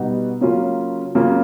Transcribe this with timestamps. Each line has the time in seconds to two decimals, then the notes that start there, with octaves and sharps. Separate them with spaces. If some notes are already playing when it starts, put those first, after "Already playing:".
Already playing: B2 G3 B3 D#4 F#4
0.41 C#3 F#3 A#3 C#4 F4
1.15 C#3 F#3 A#3 C#4 F4